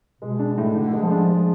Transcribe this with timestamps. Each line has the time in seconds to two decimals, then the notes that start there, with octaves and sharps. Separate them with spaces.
0.22 B2 G#3
0.39 D4
0.58 A2
0.75 A2 D3
0.93 G#3
1.02 F3
1.11 D4
1.29 G#3